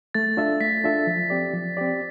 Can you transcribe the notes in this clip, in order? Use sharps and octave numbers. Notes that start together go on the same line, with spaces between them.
A3 A6
D4 F4 A4 E5
A3 B6
D4 F4 A4 E5
F3
C4 G4 D5
F3
C4 G4 D5